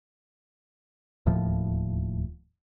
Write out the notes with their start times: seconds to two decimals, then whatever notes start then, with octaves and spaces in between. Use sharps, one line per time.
1.26 D1 D#2 A2 F3